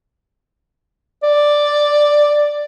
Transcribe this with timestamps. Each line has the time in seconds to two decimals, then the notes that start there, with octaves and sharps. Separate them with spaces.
1.23 D5